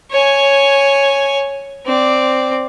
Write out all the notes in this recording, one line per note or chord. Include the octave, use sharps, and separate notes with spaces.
C#5 G#5
C4 D5